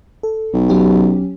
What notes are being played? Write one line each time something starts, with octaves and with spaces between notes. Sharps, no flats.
A4
B1
F#3 C#4 G4